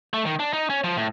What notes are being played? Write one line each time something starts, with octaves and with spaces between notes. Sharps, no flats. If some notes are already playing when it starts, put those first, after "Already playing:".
A3
D#3
D4
D#4
C#4
F3
A2